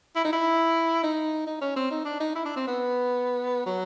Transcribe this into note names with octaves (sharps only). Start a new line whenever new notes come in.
E4
D#4
E4
D#4
D#4
C#4
C4
D#4
D4
D#4
E4
D4
C4
B3
F#3